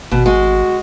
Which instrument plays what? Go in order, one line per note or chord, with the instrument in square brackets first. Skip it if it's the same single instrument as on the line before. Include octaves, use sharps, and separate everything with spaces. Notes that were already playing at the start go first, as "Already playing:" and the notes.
[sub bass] G#1 [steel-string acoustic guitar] B2
[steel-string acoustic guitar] G#3 [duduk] F#4